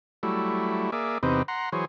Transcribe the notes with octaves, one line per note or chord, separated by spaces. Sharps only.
F#3 G3 A3 E4
A#3 G#4 D5 E5
E2 C3 B3 C4 D#4 G4
F#5 A#5 C6
E3 F#3 G#4 C5 C#5